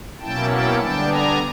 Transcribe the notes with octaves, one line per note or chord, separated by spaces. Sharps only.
B2 F#3 A#3 C#4 E4 G5 A5
G5 A5
D3 G3 B3 D4 G5 A5
G#5 A#5